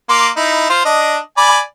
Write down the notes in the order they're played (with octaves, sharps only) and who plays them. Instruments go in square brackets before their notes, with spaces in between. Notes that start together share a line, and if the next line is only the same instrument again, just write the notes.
[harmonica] A#3 C6 D6
D#4 E4
F4 C5
D4 D#5
D5 G#5 B5